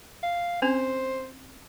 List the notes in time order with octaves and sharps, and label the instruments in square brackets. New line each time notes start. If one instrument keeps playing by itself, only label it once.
[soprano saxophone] F5
[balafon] C4 C#4 [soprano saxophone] C5